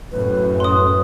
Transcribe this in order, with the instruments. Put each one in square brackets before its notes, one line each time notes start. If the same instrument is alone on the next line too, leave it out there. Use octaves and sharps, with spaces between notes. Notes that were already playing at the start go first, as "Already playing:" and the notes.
[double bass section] F#2 A2 [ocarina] B4
[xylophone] C6 D#6